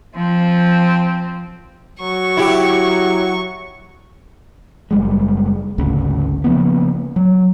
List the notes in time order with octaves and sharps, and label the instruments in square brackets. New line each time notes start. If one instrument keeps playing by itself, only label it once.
[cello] F3 C4
[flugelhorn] F#3 [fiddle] C#6
[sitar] E4 G4
[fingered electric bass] F#1 G3 G#3
G#1 D2 C#3
C#3 F3 A#3 B3
F#3